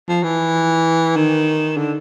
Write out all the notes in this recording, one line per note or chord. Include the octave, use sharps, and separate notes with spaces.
F3
E3
D#3
D3